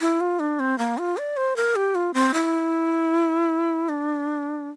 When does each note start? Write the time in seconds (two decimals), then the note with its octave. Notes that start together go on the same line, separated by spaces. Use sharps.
0.01 E4
0.21 F4
0.40 D4
0.60 C4
0.79 A#3
0.98 F4
1.17 D5
1.37 C5
1.56 A#4
1.76 G4
1.95 F4
2.14 C4
2.34 E4
3.89 D4